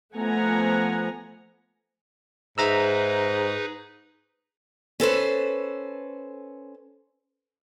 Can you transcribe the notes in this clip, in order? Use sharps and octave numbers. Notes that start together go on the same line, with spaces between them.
F3 A3 B3 F#5 G#5 A#5
G#2 D#4 G#4 B4 E5 A#5 E6
C#4 A4 B4 C5